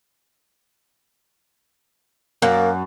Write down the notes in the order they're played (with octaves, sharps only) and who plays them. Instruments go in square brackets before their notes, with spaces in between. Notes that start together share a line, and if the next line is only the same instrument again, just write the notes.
[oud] F#2 [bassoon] A#3